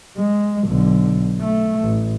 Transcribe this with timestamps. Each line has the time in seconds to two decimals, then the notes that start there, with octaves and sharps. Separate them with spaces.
0.18 G#3
0.67 B1 D3
1.41 A3
1.81 A1